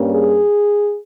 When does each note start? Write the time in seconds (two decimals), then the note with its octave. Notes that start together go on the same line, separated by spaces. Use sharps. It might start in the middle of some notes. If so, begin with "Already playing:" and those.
Already playing: G2 G3 A#3 C#4
0.10 G#4